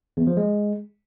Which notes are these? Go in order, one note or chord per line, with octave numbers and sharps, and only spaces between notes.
E2
F3
G#3